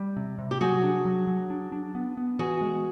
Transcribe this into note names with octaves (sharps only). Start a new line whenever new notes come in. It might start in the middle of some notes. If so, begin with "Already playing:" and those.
Already playing: G3
C3
C3
G4
F#3 F#4 G#4
D4
F#3
F#3
D4
D4
B3
B3
E3 F#4 G#4
G#3